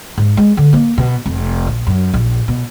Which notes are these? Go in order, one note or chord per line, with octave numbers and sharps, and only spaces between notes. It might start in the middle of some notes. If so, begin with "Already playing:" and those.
G#2
G#3
D3
A#3
B2
F1
A#1
F#2
A#1
B2